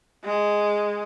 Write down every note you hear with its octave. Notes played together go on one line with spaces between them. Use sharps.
G#3